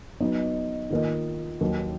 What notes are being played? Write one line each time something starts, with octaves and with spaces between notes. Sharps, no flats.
F#3 B3 D#4
D#3 A#3 F4 A#4 D#5
D#2 D#3 F#3 A#3